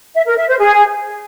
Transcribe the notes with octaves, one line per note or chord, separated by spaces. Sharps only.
E5
A#4
E5
C5
G#4